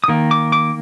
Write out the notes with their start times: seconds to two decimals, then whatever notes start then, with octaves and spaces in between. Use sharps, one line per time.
0.04 D#6
0.08 D#3 A#3
0.31 D6
0.52 D6